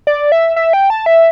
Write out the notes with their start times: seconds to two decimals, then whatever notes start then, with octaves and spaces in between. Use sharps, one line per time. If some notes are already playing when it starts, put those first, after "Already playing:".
0.07 D5
0.32 E5
0.56 E5
0.73 G5
0.90 A5
1.06 E5